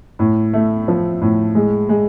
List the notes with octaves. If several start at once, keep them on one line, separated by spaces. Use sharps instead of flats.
A2
A3
F3
A2
G#3
G#3